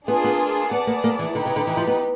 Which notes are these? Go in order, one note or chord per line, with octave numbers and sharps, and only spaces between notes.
A#3 B3 D4 F4 G#4
B3
B3 G#4 B4 D5 F#5 A5
A#3
A#3
E3
D3 D#4 G4 B4
C#3
D3
E3
F3
B3